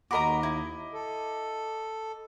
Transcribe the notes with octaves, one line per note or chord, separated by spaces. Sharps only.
D#2 F#4 A#4 D#5 A#5 B5 D6
E4
A4